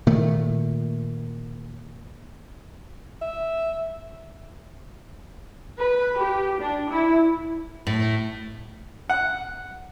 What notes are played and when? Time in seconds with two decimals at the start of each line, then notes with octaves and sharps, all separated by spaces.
0.07 A#2 D#3 A3
3.22 E5
5.78 B4
6.19 G4
6.60 D4
6.89 E4
7.87 A2
9.10 F#5